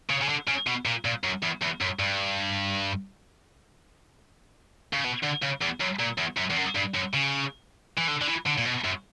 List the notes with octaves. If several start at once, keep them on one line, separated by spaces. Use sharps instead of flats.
C#3
C#3
D3
C#3
B2
A#2
A#2
F#2
E2
E2
F#2
G2
C#3
B2
D3
C#3
E2
F#2
A#2
E2
F#2
E2
F#2
G2
F#2
C#3
E3
D3
D3
E3
D3
A#2
B2
F#2